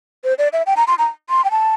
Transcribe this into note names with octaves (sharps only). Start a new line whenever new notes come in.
C5
D5
E5
G5
A#5
C6
A#5
C6
G5
A5